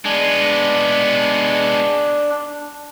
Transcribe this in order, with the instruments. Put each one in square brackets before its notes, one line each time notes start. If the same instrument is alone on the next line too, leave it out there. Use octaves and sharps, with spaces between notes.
[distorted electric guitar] G#3 B3 [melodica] D4